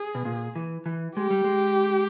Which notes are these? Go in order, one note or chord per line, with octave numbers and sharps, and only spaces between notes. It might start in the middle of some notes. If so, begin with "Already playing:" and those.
Already playing: G#4
B2
A#2
E3
E3
G#3 G4
G3
G#3